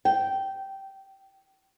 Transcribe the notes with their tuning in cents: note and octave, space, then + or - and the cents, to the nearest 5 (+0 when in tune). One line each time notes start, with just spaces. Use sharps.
G5 -10